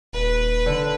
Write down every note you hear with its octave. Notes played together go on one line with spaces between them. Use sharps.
D#1 B4
D3